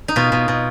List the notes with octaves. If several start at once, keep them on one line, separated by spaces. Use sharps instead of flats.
D#4
B2 F4
B2
B2